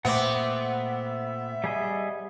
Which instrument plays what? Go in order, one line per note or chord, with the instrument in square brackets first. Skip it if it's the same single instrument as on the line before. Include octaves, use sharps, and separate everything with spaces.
[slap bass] A#2 A3 [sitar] B3 C4 [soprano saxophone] E5 [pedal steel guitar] F#5 D6
[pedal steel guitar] G3 G#4 D#5